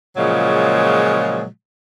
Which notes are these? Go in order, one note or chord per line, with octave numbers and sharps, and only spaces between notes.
A#2 C#3 F3 F#3 G#3